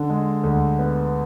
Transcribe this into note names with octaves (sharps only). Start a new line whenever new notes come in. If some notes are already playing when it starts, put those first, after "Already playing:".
Already playing: D3
G#3
D2
B3